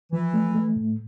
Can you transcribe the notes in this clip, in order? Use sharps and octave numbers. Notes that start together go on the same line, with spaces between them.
E3 F3
A3
A3
A2